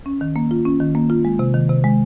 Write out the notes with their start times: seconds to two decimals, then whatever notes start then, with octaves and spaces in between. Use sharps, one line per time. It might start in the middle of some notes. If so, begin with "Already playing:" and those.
0.06 C#4
0.21 D#3
0.36 A#3
0.51 F4
0.66 C#4
0.80 D#3
0.95 A#3
1.10 F4
1.25 G#3
1.39 C3
1.54 D#3
1.69 C3
1.84 G#3